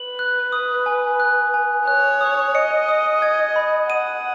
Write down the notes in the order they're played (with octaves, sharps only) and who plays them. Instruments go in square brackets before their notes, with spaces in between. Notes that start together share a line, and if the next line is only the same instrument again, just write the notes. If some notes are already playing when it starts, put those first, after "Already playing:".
Already playing: [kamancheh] B4 [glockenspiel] F#7
[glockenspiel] F#6
D#6
G#5
F#6
G#5
[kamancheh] C#5 [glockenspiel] F#6
[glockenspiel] D#6
[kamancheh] D#5 [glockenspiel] C#7
[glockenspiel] D#6
G#6
B5
[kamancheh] F#5 [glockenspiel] D#7